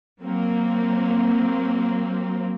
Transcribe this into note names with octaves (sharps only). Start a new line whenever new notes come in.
F#3 A#3 C4